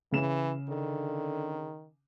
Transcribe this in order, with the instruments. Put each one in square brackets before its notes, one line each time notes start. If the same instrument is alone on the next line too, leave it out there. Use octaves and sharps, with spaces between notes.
[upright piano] C#3 E7 [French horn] E3
[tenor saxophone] D3 [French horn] D#3